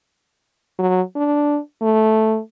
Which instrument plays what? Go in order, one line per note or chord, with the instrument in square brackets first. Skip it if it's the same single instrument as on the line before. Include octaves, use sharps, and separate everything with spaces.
[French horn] F#3
D4
A3